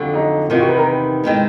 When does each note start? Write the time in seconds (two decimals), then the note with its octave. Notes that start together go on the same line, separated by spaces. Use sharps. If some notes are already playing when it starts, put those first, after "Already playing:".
Already playing: F2 D3 F#3
0.14 D#4
0.50 E2 C3 D#3 F4
0.59 F#4
0.69 B4
0.77 A#4
0.87 B4
1.24 C3 D#3 G#3 C4